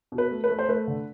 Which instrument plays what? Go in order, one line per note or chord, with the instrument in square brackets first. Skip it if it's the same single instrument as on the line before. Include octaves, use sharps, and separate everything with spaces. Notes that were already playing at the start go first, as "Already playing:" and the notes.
[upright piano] B2
B4
A3
B4
A3
C5
A3 B4
D3